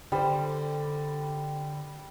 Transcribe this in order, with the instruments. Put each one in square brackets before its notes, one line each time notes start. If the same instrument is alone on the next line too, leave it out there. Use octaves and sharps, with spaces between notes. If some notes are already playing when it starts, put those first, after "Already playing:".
[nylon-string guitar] D3 A4 C5 [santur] G3